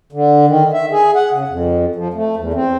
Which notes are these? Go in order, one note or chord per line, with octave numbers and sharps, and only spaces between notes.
D3
D#3
E5
G#4
F#5
C#3
F2
F3
A3
E2
C4